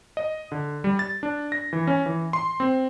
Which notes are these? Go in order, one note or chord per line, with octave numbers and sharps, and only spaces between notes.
D#5
D3
G3
A6
D4
A#6
E3
C#4
E3
C6
C4